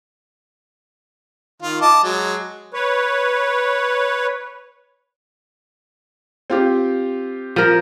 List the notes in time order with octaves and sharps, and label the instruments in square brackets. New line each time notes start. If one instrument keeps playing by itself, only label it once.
[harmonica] D#3 F4
D#5 A5 D6
F#3 G#3
[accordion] B4 C#5
[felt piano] C4 F4 G4
[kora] F3 A#4